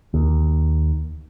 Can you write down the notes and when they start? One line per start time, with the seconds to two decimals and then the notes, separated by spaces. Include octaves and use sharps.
0.14 D#2